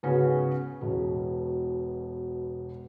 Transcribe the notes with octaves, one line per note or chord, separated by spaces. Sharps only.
G#2 C#3 B3 C#4 F#4
E1 B2